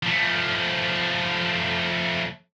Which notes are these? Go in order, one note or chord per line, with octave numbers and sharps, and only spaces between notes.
F3 A3